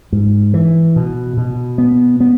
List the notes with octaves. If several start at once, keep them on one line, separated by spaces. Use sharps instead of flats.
G#2
E3
B2
B2
B3
B3